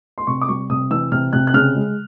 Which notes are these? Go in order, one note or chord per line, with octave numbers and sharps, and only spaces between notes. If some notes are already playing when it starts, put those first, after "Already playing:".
C6
C3 C#6
D6
G3 C#6
C3 D#6
E3 E6
C3 F6
C3 F#6
F#6
C#3 F6
G#3